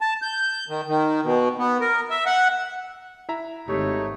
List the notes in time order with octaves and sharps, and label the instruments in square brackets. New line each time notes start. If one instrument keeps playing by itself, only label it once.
[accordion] A5
G6
D#3
D#3
B2
B3
A#4
E5
F#5
[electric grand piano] E4 E5 A#5
[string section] G#1 [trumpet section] A3 D#4 C#5 [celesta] G4